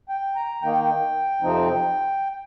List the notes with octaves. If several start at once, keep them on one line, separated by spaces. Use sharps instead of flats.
G5
A#5
D#3 A#3 D#4 G5
F2 C3 F3 C4 D#4